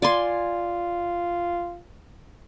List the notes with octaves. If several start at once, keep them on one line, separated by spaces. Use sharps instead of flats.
F4 D5 G#5 C6